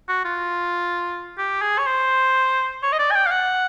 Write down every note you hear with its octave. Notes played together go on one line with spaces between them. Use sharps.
F#4
F4
G4
G#4
C#5
C5
C#5
D#5
D5
G#5
G5
F5
F#5